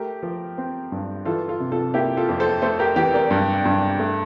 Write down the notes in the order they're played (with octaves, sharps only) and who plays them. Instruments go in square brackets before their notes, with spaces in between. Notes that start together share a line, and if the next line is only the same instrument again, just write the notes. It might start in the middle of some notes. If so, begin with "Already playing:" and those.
Already playing: [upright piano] A3 G4 A#4
F3
C4
G2
E3 F4 A4
F4 A4
C3
F4 A4
A#3 E4 G4
F4 A4
F2
A4 C5
A3 A4 C5
G4 A#4
E3 G4 A#4
A#4 D5
G2
G2
A3